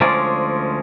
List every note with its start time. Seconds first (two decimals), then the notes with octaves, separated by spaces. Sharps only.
0.01 D2 F3 G#3 C#4 A#4 D5